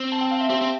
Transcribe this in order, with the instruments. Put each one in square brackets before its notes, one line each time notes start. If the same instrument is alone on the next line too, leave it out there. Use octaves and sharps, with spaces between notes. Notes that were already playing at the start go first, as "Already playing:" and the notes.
Already playing: [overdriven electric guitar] C4
[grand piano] A5
G5
F5
E5
[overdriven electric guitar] C4 [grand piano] G4
[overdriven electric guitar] C4